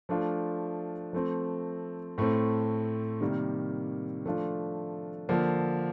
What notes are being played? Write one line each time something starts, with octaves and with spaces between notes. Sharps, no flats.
F3 A3 D4 F4
F3 A3 C4
A2 A3 C4
C3 D#3 G3 A#3
F3 A3 D4 F4
D3 F3 A#3